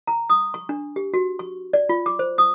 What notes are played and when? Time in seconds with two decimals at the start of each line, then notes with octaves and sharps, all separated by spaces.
0.07 A#5
0.30 D#6
0.54 C#6
0.69 D4
0.96 G4
1.14 F#4
1.39 C#6
1.73 D5
1.89 F4
2.06 D6
2.19 C5
2.38 D#6